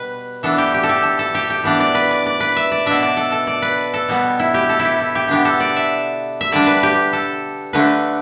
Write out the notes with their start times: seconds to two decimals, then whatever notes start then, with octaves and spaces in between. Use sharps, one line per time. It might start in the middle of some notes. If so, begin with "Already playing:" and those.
Already playing: B2 G3 B4
0.43 E3 B3 D4 A4
0.58 G4
0.74 G4
0.83 A4
0.89 G4
1.03 A4
1.19 A4
1.35 G4
1.50 G4
1.64 E3 B3 D4 D5
1.80 D5
1.95 B4
2.11 D5
2.26 D5
2.40 B4
2.56 E5
2.72 D5
2.86 B2 B3 D4 E5
3.02 D5
3.17 A4
3.32 A4
3.47 D5
3.62 B4
3.94 A4
4.08 B2 G3 B3
4.39 E4
4.54 G4
4.69 A4
4.79 E4
4.85 G4
5.00 E4
5.15 G4
5.28 D3 B3 D4 G4
5.45 A4
5.60 D5
5.76 E5
6.41 E5
6.52 D3 G3 D4 D5
6.67 B4
6.83 G4
7.13 A4
7.73 D3 A3 D4 B4